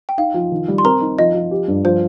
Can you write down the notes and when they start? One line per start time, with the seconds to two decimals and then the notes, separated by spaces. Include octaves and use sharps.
0.09 G5
0.18 D#4 F5
0.34 F3
0.52 D#3
0.68 G3
0.78 C6
0.84 C4 A#4 A#5
1.01 D#4
1.18 F3 D#5
1.35 F3
1.51 G4
1.68 G2
1.84 F3 C5